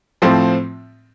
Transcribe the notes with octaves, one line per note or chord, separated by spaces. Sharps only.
A2 F3 C4